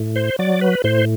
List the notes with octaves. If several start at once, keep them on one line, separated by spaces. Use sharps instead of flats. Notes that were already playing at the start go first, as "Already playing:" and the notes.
Already playing: A2
C5
F#3 D5
B4
A2 C5